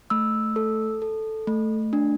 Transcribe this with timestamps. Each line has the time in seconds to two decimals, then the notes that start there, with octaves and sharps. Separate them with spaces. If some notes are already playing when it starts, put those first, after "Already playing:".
0.10 A3 E6
0.56 A4
1.02 A4
1.47 A3
1.93 D4